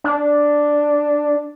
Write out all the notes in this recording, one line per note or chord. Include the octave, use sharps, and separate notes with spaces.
D4